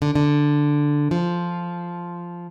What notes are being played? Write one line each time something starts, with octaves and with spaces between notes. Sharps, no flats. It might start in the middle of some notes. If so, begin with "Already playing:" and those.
D3
D3
F3